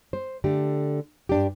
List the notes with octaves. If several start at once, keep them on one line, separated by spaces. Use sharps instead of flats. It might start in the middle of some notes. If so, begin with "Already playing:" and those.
C5
D3 A3 G4
G2 D4 G4